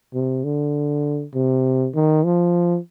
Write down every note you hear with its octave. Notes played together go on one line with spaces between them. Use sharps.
C3
D3
C3
D#3
F3